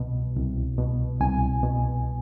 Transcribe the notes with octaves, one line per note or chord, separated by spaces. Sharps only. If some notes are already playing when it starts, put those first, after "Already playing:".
Already playing: C2 B2
C2
B2
C2 G#5
B2